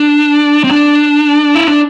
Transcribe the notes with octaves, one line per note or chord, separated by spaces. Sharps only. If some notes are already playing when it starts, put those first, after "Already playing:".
Already playing: D4
C4
D4
E4
D4